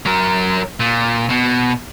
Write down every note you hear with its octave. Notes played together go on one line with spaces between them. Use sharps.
F#3 A#4
A#2
B2